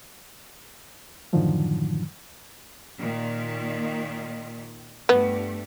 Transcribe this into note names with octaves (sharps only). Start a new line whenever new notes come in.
F#2 A2 D3 D#3 F3 F#3
A#2 D#3
G2 A3 B3